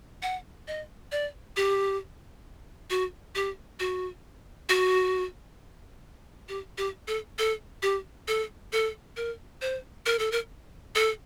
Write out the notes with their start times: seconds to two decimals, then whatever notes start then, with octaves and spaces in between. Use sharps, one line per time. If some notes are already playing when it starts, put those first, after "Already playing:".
0.22 F#5
0.68 D#5
1.12 D5
1.56 G4
2.90 F#4
3.35 G4
3.80 F#4
4.69 F#4
6.49 G4
6.78 G4
7.08 A4
7.39 A4
7.83 G4
8.28 A4
8.72 A4
9.17 A#4
9.62 C5
10.06 A#4
10.19 A4
10.32 A#4
10.95 A4